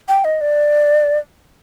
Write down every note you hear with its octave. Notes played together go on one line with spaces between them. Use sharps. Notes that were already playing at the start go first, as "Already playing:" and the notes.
G5
D#5
D5